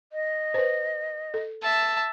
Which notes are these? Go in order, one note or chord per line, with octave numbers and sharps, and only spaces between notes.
D#5
B4 C5
A4
E5 A5